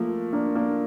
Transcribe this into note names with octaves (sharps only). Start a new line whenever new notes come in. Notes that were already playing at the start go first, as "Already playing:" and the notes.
Already playing: F3 A3 A#3
A#3 D4
A#3 D4